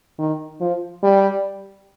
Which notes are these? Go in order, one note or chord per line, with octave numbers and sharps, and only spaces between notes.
D#3
F3
G3